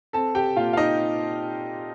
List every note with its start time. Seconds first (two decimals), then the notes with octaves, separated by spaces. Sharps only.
0.13 C4 A4 A5
0.35 G4 G5
0.56 A#2 F4 F5
0.73 F5
0.77 D#4 D#5